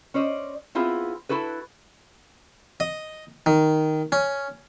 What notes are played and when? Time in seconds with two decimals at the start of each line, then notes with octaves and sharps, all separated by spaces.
0.14 C#4 C5 D5 D#5
0.75 B3 C4 E4 F4 G#4
1.29 E4 F#4 A4 B4
2.80 D#5
3.46 D#3
4.12 C#4